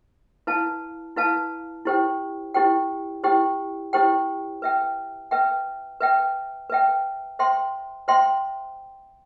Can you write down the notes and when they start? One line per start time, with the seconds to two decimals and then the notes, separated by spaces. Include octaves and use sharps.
0.47 E4 B4 F5 A5
1.16 E4 B4 F5 A5
1.85 E4 G4 C5 G5
2.54 E4 G4 C5 G5
3.24 E4 G4 C5 G5
3.93 E4 G4 C5 G5
4.62 B4 E5 G5
5.31 B4 E5 G5
6.01 B4 E5 G5
6.70 B4 E5 G5
7.39 C5 E5 G5 C6
8.08 C5 E5 G5 C6